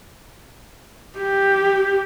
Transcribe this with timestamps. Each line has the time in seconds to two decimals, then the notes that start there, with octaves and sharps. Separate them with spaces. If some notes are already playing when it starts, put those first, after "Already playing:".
1.19 G4